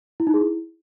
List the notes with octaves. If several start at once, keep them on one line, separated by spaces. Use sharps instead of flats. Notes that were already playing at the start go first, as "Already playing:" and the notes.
E4
D#4
G#4
E4